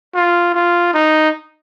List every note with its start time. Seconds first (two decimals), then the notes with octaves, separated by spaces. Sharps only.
0.15 F4
0.54 F4
0.94 D#4